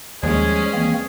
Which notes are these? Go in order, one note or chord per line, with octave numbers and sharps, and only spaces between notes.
D#2 F3 G3 G#3 C#4 G#4
E3 A#3 C4